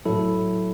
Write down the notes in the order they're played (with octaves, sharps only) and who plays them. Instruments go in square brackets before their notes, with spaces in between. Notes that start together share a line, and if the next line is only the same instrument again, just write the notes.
[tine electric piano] A2 F#3 E4 A4